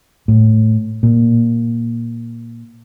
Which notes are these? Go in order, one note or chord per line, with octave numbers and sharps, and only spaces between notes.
A2
A#2